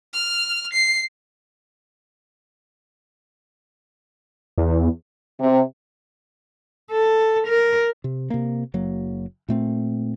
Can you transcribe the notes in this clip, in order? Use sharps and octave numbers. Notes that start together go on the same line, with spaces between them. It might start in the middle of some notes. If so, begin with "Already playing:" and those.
F6
C7
E2
C3
A4
A#4
C3
C3 A#3
F#1 F#3 A#3
A#2 A3 C4